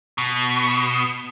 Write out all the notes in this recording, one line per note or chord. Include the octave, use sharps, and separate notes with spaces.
B2